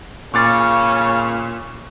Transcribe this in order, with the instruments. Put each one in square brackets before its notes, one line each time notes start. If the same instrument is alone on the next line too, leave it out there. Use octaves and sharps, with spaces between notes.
[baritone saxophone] A#2 [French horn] C#3 [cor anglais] C#4 [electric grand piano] C#6 D6 A6